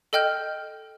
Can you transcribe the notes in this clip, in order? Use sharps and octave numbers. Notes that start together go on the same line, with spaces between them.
A4 D#5 G5 F6 G6